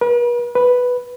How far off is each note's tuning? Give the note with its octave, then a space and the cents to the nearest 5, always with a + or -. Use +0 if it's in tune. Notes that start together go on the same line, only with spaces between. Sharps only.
B4 -45
B4 +0